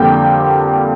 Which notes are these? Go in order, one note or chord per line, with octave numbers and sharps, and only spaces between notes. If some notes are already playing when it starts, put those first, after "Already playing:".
Already playing: F2 D3 G3 A#3 G5